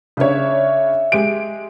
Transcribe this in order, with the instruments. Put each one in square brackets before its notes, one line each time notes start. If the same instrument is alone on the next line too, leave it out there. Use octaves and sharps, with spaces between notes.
[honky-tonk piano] C#3 D4 C#5 [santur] D#5 E5
[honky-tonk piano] G#3 G4 D7